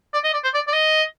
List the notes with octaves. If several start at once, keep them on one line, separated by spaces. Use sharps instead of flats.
D5
D#5
D5
C5
D5
D5
D#5